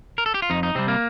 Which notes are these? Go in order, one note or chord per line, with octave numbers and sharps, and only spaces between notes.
A#4
A4
G4
F4
F2 D#4
D#4
C3 G3 C4
A#3